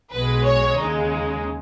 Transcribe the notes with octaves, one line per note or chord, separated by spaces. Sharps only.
B1 B2 G#3 B4
C#5
D#2 C#3 G#3 D#4